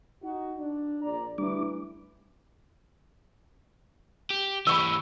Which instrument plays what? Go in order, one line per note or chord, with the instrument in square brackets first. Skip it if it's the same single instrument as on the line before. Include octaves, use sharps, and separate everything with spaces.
[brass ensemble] D#4 F#4
D4
A#1 D5 A#5
[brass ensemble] D2 E3 [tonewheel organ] G3 D4 D6
[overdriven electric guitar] G4
[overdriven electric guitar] E3 G4 [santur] B5 C#6 E6